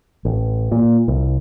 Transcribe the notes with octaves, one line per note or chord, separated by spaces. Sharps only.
A1
A#2
C2